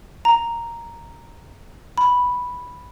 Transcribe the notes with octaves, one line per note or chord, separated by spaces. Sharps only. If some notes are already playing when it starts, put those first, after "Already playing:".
A#5
B5